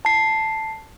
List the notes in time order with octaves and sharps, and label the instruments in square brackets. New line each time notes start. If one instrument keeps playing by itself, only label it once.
[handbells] A5 C7